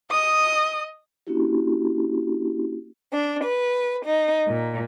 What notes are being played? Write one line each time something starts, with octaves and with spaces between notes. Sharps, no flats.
D#5 D#6
A#3 C#4 D4 E4 F#4 G4
D4
B4
D#4
A#2